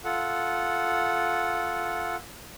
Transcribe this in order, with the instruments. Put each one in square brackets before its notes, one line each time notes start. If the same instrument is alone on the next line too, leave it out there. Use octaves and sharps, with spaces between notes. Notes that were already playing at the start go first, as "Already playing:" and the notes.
[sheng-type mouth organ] F4 A4 F#5